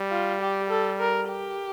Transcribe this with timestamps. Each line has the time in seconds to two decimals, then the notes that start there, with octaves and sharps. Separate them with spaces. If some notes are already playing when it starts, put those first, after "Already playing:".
Already playing: G3
0.11 F4
0.41 G4
0.70 A4
0.99 A#4
1.29 G4